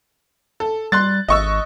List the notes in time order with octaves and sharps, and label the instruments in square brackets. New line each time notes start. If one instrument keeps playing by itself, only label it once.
[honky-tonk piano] A4
[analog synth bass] G3 [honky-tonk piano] C6 F#6 A6
[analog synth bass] G#1 [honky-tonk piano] D#5 C#6 E6